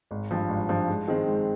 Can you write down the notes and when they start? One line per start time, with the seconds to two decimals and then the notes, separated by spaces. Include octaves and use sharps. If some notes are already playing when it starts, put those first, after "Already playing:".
0.11 G#1
0.31 G2 F3
0.49 G#1
0.69 G2 F3
0.88 G#2
1.08 D#3 G#3 C4
1.27 G#2